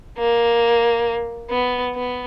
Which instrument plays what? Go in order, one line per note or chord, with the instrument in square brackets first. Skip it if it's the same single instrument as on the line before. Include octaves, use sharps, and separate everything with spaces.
[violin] A#3
B3
B3